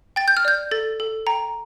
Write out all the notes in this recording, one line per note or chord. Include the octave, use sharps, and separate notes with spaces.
G5 A6
G6
F6
D5 G6
A4 A6
A4
G5 A#5